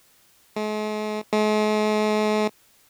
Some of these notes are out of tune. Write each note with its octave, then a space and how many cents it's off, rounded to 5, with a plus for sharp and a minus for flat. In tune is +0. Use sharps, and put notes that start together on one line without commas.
G#3 +45
G#3 +45